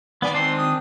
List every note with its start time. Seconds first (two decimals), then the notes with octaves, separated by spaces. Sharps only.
0.22 D#3 B3 D5 G#5
0.34 C4 D4 C6
0.57 D#6